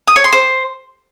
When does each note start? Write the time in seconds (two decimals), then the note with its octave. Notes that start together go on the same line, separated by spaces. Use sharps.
0.08 D#6
0.16 C#5
0.24 C6
0.33 C5